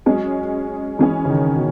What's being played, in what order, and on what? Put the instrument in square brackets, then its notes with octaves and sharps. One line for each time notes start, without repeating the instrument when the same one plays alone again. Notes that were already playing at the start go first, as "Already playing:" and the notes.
[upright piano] F#3 [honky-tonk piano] G#3 C#4 G#4
[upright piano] E3 [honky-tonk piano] G#3 C#4 G#4
[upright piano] C#3
D#3
B2